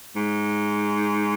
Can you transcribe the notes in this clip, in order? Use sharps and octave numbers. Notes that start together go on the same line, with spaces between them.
G#2